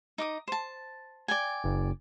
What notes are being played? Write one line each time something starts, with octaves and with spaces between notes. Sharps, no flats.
D#4 D6 D#6
C5 A5
D5 G5 G#5
F#1